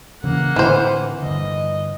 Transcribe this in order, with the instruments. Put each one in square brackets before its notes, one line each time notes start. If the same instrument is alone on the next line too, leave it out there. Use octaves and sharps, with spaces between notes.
[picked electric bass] C#3 E3 [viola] A#3 F#5
[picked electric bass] A2 D3 C4 [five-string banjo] E3 C5
[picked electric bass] G2 D3 [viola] D#5